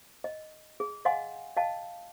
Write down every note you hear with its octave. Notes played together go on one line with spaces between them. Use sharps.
D#5
G#4
D#5 F5 F#5 G#5 C6
D#5 F5 G5 A5